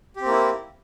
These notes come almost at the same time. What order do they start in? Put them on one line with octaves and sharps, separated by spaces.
G4 C4 A#3 E4